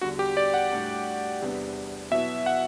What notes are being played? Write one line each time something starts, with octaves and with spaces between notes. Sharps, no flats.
E2 D3 G3 F#4
G4
D5
F#5
A2 G3 D4 F#4
E2 C3 G3 B3 D4
B2 F#3 B3 E4 E5
F#5